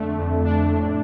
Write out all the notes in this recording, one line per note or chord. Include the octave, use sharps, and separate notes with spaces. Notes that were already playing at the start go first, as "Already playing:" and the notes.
Already playing: F2 D3 A3 D4
F2
D4
A2